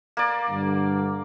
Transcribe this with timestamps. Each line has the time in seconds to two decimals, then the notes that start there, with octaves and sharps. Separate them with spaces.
0.17 A#3 D5
0.50 G2 D3